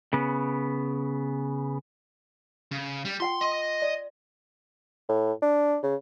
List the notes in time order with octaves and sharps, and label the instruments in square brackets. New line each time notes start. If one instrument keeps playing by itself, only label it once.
[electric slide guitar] C#3 B3
[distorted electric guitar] C#3
G3
[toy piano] F4 F#5 G5 [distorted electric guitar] C6
[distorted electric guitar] D#5 [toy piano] C6
[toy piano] D5
[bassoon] A2
D4
C#3